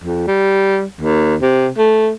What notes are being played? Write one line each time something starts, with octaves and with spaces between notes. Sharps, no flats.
F2
G3
D#2
C3
A3